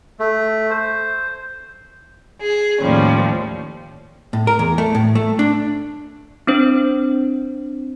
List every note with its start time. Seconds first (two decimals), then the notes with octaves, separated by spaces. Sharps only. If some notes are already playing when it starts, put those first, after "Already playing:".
0.19 A3
0.70 C5
2.41 G#4
2.81 D#2 A2 F3 G3 C#4
4.33 A2
4.47 A#4
4.59 E2
4.78 A3
4.95 A2
5.15 A3
5.39 D4
6.47 C4 D4 C5